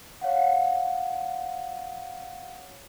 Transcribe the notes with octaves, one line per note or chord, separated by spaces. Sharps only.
C#5 F5 F#5